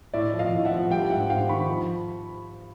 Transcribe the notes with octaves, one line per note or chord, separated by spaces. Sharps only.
A2 D5 E5
F3
D#5 F5
A2
E5 F#5
F3
G3 F5 G5
G#2 E5 F#5
G#2 F5 G5
D#3 B5 C#6
F3